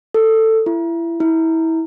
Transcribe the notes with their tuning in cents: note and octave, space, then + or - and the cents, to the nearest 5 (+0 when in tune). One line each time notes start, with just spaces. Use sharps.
A4 +15
E4 +25
E4 -25